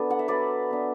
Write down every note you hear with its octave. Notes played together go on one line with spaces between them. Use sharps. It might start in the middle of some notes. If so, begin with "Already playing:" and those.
Already playing: F#3 B3 D4 A4 B4 D5
F#5
E5
F#3 B4 D5
B3 D4